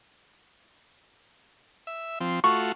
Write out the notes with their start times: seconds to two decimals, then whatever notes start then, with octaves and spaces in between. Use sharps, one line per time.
1.87 E5
2.21 F3 C4
2.44 A3 F4 F#4 C#6